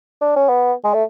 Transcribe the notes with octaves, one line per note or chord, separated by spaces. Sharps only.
D4
C#4
B3
G#3
A3